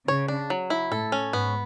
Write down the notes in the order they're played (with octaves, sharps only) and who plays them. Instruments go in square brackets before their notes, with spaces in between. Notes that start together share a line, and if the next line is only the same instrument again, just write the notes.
[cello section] C#3 [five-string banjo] C#5
[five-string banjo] D4
F#3
E4
[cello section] A2 [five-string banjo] A4
[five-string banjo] C#4
[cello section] G#2 [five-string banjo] B3